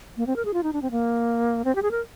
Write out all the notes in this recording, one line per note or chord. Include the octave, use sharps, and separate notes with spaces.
A#3
C4
A#4
G#4
F4
D#4
D4
C4
A#3
C4
G4
G#4
A#4